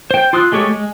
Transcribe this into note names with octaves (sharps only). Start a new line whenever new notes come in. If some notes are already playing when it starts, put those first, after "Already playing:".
C5 G5
F4 C6 D#6 E6 F#6
G#3 A3 G4 G#4 C#5
G#3